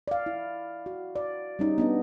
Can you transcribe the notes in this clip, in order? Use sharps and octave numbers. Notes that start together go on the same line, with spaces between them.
D5 F5
E4
F#4
D5
G3 C#4 D#4
B3 D4 D#5